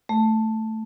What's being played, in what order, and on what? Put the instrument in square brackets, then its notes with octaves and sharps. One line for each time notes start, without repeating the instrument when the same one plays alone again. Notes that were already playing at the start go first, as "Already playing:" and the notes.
[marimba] A3